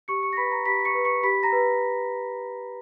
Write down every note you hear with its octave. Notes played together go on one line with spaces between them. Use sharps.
G4 C#6 C#7
C#6 C#7
A#6
B4 B5 B6
A#5 A#6
G4 B5 B6
B6
C#6 C#7
B4
C#6 C#7
G4 B5 B6
A#5 A#6
B4